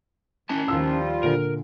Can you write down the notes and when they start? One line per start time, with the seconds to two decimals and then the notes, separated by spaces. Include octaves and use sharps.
0.49 D#3 C#4 E4 A5
0.68 D#2 F3 G3 F4 E6
1.23 A#2 D3 A#4